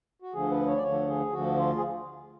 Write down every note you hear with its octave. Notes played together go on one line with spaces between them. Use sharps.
F#4
D2 D3 F3 G#4
B4
C#5
D5
D2 D3 F3 C#5
G#4
D2 D3 F3 F#4
F4
G#4